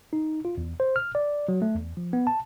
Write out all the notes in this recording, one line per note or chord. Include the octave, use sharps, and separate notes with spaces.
D#4
F4
E2
C5
F6
D5
F#3
A3
E2
F3
B3
A5